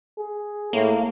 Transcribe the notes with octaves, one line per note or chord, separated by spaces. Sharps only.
G#4
A2 A#3